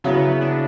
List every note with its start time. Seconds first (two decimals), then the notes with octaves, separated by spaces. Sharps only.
0.04 C#3 F#3 B3 C#4 E4
0.22 B3
0.41 D4